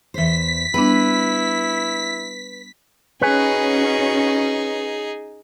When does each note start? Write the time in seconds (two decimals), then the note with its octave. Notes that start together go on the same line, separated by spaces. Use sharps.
0.14 E2 C5 B6
0.74 G3 B3 D4 E4 B4
3.22 C#4 D#4 F#4 G#4 B4 C#5 G#5